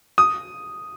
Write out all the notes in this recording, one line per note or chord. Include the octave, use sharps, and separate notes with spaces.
D#6